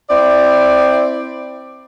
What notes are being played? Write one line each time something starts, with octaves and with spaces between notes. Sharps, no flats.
C4 E4 D5